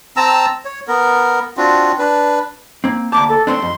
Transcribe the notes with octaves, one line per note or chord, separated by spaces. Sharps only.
C4 A5 A#5 E6
C#5
B3 A#4
C4 D4 F4 F#4
D4 B4
A#3 C4
D2 A#3 A5 D6
A4
A3 C4 D4 C6
F2